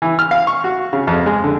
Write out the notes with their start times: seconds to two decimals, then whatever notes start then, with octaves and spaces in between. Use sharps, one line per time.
0.02 E3
0.19 F6
0.31 F5
0.47 C#6
0.64 F#4
0.93 C#3
1.07 F2
1.26 G#3
1.44 D3